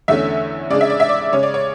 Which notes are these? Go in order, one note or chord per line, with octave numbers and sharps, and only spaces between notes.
E2 D3 A3 C#4 E5
C#3 G#3 D4 D5
E5
D5
E5
D5
C#3 G#3 C#4 C#5
D5
C#5